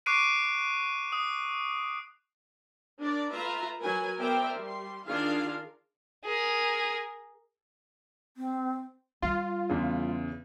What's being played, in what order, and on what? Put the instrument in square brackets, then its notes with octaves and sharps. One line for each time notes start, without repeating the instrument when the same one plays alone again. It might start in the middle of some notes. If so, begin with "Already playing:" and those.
[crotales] C#6 D6 F#6 C7 D7 D#7
D#6
[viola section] D4 A#4 D5
A3 F4 B4 E5 A#5
F#3 A#4 B4 G#5
B3 A#4 C5 D5 E5 G5
G3 C6
D#3 D4 F4 G#4 A#4 F5
[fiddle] G#4 A#4
[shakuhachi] C4
[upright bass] G3 [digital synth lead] F4
[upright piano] E2 C#3